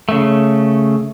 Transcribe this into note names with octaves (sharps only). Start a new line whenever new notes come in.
C#3 A3